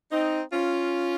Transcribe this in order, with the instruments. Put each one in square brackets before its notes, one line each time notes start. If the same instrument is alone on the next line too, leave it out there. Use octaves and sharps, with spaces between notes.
[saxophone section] C4 D#4
C#4 F4